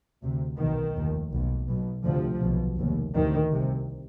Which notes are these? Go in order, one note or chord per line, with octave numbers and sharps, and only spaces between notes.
D2 C3
B1 B2 D#3
F1 D#2
B1 B2
B1 B2
D2 C3 F3
B1 B2
F1 D#2
D2 C3 D#3
C2 C3